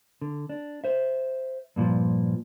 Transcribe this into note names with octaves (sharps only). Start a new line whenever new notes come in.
D3
D4
C5 E5
G2 A#2 E3 F3